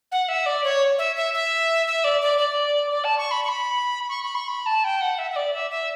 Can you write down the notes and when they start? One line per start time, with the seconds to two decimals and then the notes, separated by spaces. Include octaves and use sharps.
0.11 F#5
0.28 E5
0.46 D5
0.64 C#5
0.98 E5
1.16 E5
1.34 E5
1.87 E5
2.04 D5
2.21 D5
2.38 D5
2.91 D5
3.04 A5
3.18 C#6
3.31 B5
3.44 C#6
3.48 B5
4.09 C#6
4.23 B5
4.35 C#6
4.48 B5
4.66 A5
4.84 G5
5.01 F#5
5.18 E5
5.31 E5
5.36 D5
5.53 E5
5.71 E5